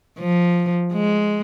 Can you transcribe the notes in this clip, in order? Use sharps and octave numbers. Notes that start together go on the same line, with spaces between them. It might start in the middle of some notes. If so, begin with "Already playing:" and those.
F3
G#3